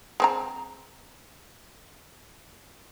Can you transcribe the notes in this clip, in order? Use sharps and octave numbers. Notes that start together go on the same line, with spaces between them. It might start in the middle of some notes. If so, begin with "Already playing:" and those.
G#3 C4 A#5